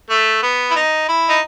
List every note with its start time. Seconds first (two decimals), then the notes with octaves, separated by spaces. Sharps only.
0.10 A3
0.43 B3
0.71 E4
0.76 D#4
1.08 E4
1.29 D#4